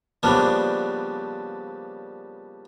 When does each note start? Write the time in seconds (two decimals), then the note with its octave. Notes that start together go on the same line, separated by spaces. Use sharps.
0.23 C#3 F3 G3 A#3 B3 D4